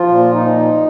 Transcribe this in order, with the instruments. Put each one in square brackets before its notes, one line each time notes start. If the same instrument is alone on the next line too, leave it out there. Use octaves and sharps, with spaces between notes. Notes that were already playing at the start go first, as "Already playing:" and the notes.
Already playing: [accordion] F3 F4
A#2
D#4